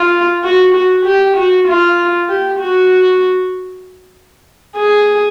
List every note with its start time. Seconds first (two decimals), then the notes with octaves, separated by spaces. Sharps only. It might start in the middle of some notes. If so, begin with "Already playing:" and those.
Already playing: F4
0.43 F#4
0.74 F#4
1.06 G4
1.37 F#4
1.67 F4
2.29 G4
2.60 F#4
4.76 G#4